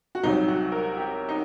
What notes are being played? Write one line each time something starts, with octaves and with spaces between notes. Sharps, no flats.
F#4
C2 C3 F#3 D#4
F#4
A#4
G4
D#4